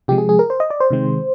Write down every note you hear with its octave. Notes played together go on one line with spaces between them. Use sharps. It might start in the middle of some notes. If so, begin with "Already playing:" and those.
C3 F3 G#3 G4
G#4
G#4
A#4
C5
D#5
D5
C5
C3 D#3 G#3 C4